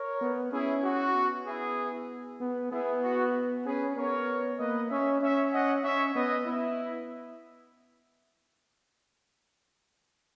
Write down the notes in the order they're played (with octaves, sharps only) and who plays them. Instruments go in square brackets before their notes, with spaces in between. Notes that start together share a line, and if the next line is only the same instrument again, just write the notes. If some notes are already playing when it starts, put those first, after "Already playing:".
Already playing: [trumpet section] A#4 C#5
[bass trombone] B3
[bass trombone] C#4 [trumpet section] E4 G#4
[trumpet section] F#4
[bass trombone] B3
[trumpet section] E4 G#4
[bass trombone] B3
[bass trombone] B3 [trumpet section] E4 G#4
[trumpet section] F#4
[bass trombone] C#4 [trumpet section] G#4 B4
[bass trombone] B3 [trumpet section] A#4 C#5
[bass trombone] A#3 [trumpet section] B4 D#5
[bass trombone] C#4 [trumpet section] C#5 E5
[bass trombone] C#4 [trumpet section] C#5 E5
[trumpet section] D#5 F#5
[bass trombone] C#4 [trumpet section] C#5 E5
[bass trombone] B3 [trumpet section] B4 D#5
[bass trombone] B3 [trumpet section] E4